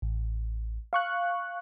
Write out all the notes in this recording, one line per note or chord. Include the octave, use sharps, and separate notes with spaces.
A1
F5 C#6 F#6